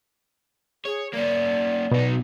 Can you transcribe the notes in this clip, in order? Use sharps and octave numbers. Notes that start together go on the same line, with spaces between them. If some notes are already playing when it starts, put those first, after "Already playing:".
G#4 C#5
A#3 C#4 D5
B1 B2 D#4